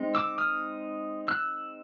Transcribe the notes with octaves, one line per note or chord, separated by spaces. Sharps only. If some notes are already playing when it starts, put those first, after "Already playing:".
Already playing: G#3 C4 D#4
D6 E6
D#6 F6
E6 F#6